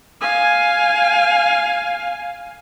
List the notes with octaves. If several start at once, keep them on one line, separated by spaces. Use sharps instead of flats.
F5 G#5